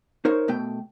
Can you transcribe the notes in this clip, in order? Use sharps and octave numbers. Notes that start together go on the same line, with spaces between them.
D#4 A#4 C5 C#5
B2 A3 G5